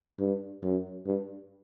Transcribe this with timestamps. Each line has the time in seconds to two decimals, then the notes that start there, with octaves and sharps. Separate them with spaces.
0.19 G2
0.63 F#2
1.06 G2